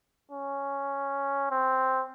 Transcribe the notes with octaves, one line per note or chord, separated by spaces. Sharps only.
C#4
C4